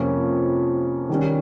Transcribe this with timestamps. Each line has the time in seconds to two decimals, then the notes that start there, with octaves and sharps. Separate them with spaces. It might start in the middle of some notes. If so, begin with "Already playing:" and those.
Already playing: F2 C3 F3 A#3 C#4
1.09 D#3 G3 C#4